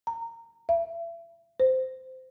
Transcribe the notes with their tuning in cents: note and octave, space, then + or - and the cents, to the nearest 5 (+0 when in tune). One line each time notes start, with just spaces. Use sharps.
A#5 -20
E5 +35
C5 -15